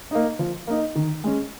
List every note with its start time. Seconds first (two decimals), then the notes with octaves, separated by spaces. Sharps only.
0.11 A#3 D#4
0.39 F3
0.67 A#3 D#4
0.96 D#3
1.24 G#3 C#4